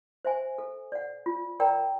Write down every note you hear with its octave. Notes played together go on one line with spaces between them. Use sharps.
C5 E5 G#5
A4
D5 F#5
F4
A#4 D5 G5 A#5